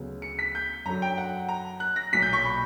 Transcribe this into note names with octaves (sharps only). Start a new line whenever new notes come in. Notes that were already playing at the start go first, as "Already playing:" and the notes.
Already playing: D2 C#3 F#3 B3
C#7
B6
G6
F#2 D3 F#3 A#5
G5
F#5
A#5
F#6
A#6
B1 A#2 F#3 B6
G6
C#6
B5